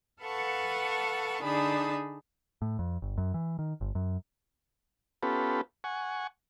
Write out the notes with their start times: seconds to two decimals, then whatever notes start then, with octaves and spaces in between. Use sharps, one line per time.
0.22 A4 B4 F5 F#5 A5 C#6
1.43 D3 D4 D#4 G#4 A5 B5
2.62 A2
2.79 F2
3.02 G1
3.18 F#2
3.34 E3
3.59 D#3
3.81 G1
3.95 F#2
5.23 B3 C#4 F4 G4 A4 B4
5.84 F#5 G#5 C#6